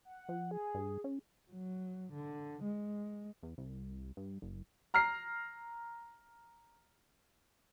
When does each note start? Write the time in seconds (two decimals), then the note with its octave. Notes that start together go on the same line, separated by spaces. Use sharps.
0.05 F#5
0.29 F3
0.51 G#4
0.74 G2
1.04 C#4
1.52 F#3
2.13 D3
2.64 G#3
3.43 E2
3.58 C2
4.17 G2
4.42 F#1
4.94 A#5 F6 A#6 C7